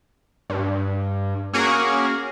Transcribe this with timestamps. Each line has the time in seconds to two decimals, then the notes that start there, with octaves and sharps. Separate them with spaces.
0.50 G2
1.53 A#3 C#4 F#4 G#4 A#4